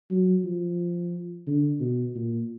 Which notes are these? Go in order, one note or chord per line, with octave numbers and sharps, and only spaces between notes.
F#3
F3
D3
B2
A#2